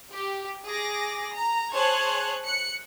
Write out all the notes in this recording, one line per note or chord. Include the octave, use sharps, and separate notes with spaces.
G4
G#4 D6 A#6
A#5
G#4 C5 C#5 A5 F#6 G#6
F#6 C#7